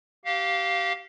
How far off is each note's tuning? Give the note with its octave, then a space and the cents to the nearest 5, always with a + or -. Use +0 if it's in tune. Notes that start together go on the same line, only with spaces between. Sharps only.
G4 -25 F5 +0